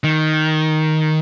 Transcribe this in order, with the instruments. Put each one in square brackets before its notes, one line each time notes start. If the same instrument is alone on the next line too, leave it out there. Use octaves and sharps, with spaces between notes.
[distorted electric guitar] D#3